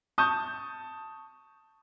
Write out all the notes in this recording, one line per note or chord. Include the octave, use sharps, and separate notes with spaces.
A5 C#6 D#6 G6